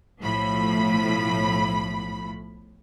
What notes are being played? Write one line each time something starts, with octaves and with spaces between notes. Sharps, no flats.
B1 A2 F3 B5